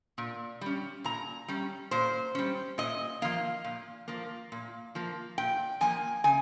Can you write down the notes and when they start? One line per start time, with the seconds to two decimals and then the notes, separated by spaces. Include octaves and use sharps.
0.18 A#2
0.61 G3 C#4
1.04 A#2 A#5
1.48 G3 C#4
1.91 A#2 C5
2.35 G3 C#4
2.78 A#2 D#5
3.22 F3 A#3 F5
3.64 A#2
4.08 F3 A#3
4.52 A#2
4.95 F3 A#3
5.38 A#2 G5
5.81 F3 A#3 G#5
6.24 C#3 G#5